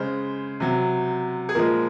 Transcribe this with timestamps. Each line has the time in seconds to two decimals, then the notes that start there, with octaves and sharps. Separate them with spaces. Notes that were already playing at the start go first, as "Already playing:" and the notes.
Already playing: C#3 G#3 C5
0.60 C3 F#3
1.49 G#4
1.55 A#2 F3 G#3 A#4